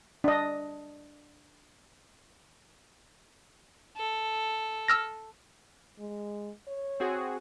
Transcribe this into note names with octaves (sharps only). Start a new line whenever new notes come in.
D4 D#5
A4
E6 F6 A#6
G#3
C#5
C4 F#4 G#4